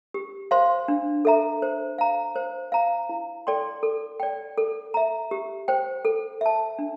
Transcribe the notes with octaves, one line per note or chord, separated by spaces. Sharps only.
G4
C5 F5 C6
D4
A4 E5 A#5
C5
F5 A#5
C5
F5 A#5
E4
A4 D5 G5 C6
A4
D5 G5
A4
E5 A#5
G4
C5 G5
A4
E5 A5
D4